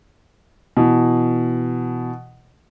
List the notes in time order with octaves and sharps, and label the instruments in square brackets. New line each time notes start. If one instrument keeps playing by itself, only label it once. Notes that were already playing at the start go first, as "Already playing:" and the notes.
[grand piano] B2 E3